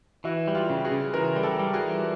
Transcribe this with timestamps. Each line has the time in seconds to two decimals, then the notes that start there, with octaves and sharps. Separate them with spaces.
0.24 E3 E4 F#4
0.48 G3
0.55 F4 G4
0.70 C#3
0.85 F#4 G#4
0.91 C#3
1.13 E3 G#4 A#4
1.36 G3
1.43 G4 A4
1.59 G3
1.73 F#4 G#4
1.81 E3